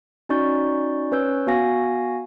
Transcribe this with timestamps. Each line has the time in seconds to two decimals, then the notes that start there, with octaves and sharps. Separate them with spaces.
0.29 C#4 D#4 F#4 D5 C#6 G6
1.11 C#4 B4 C#5 E6 G6
1.47 B3 F#4 F5 G#5 A#6